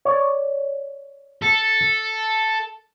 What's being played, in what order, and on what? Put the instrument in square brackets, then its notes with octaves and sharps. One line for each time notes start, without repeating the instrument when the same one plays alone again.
[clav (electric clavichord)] C#5 D5
[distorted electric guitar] A4